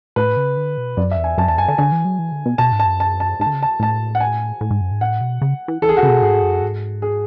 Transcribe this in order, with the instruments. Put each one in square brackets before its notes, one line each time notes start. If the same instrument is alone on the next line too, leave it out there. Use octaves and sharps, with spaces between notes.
[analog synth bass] A2 [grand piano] B4
[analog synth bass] C#3
D3
B2
[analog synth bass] F#2 [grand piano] D5
[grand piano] E5
[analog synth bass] E2
[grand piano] G#5
[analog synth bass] F#2 [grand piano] A5
[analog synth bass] E2 [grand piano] A5
[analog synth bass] F#2 [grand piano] G#5
[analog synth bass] D3 [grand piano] A5
[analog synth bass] D3 [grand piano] G#5
[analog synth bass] E3
F#3
E3
D3
B2
[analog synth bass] B2 [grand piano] A5
[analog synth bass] G#2
[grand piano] A5
[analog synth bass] F#2
[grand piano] A5
A5
[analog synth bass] G#2 [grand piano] A5
[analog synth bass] D3
C#3
[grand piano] A5
[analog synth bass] A2 [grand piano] A5
[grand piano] F#5
G#5
[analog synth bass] A2
G#2
F#2
G#2
[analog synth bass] A2 [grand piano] F#5
[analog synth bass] B2
C#3
E3
[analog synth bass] E3 [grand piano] A4
[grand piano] G#4
F#4
[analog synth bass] C#3 [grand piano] G#4
[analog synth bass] B2
[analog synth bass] G#2 [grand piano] G#4
[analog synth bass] F#2
G#2
[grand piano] G#4